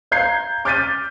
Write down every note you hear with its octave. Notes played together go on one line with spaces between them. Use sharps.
F5 A#5 G6 G#6 C7
D6 F6 G6 A6 B6 D#7